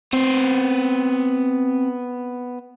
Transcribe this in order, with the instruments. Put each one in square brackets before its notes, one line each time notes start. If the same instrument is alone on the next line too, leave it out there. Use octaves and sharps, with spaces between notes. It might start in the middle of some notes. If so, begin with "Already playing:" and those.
[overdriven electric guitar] B3 C5 [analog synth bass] C4